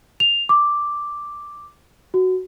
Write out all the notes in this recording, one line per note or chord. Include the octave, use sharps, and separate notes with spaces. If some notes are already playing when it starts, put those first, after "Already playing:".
F7
D6
F#4